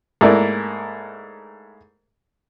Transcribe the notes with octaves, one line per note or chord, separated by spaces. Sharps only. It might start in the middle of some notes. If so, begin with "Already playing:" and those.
G#2 A3 A#3 E4 A#4 D5